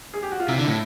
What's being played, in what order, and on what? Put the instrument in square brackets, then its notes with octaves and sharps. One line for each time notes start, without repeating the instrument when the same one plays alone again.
[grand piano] G#4
G4
F#4
F4
[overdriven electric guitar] C3 [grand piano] E4
[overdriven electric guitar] D3
A2